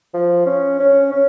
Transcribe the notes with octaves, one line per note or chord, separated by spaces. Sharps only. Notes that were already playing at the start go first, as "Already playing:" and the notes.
F3
C#4
C#4
C#4